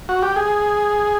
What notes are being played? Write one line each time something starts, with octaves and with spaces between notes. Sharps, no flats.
F#4
G4
G#4